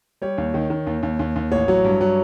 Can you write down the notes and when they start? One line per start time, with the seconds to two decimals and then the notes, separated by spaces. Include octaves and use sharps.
0.22 G3 C#5
0.38 D#2
0.54 D#3
0.70 D#3
0.87 D#2
1.03 D#2
1.19 D#2
1.36 D#2
1.51 A1 C#5
1.68 F#3
1.84 G2
2.01 F#3